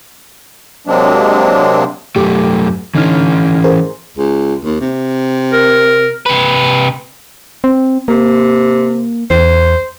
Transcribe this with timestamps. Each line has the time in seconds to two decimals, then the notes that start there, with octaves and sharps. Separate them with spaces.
0.87 C3 F#3 G#3 A#3 C4 D4
2.16 F#2 A3 G4 D6
2.95 D3 E3 C#4 D#4 F6
3.64 G#4 A#4 C5
4.17 C#2
4.64 D#2
4.81 C3
5.53 A#4
6.26 C3 B4
7.64 C4
8.08 C3 A#3
9.30 E2 C5